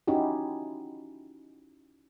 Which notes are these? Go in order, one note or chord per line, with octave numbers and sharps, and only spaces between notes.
C#4 D#4 E4 F#4 G4